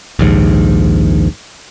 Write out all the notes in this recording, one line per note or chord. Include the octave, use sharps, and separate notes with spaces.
A#1 D#2 G#2